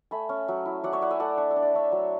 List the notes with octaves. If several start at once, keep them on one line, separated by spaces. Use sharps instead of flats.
A3 G#5 B5
C#4
F#3
E4
F#3 D5 F#5
C#5 E5
E4 D5 F#5
E5 G#5
A3 D5 F#5
D4 F#5
E5
D4
D5
D4 C#5 E5
F#3